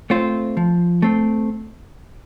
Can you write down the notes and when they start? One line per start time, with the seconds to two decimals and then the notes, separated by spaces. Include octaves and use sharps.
0.10 A3 C4 F4 C5
0.57 F3
1.02 A3 C4